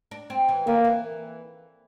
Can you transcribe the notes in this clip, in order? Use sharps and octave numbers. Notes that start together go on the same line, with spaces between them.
D4
C4
E3
D3 A#3
E3